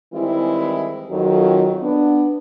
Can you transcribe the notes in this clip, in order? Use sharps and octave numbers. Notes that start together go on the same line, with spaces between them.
D#3 E3 G3 G#3 C4 E4
F2 D#3 F#3
B3 D4